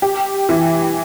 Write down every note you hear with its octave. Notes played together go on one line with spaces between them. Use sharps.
G4
E3